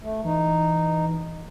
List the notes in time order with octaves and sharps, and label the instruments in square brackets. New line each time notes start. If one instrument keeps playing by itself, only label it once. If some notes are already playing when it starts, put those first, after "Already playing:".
[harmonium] A3
[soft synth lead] E3 [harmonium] D#4